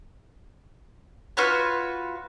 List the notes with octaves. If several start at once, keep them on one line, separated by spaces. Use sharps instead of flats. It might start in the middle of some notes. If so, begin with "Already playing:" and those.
F4 F#4 B4 C#5